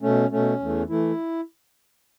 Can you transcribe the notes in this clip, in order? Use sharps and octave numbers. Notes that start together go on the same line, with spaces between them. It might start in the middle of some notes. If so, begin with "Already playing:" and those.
B2 A3 C#4
B2 A3 C#4
E2 E3 A3
E3 A3 E4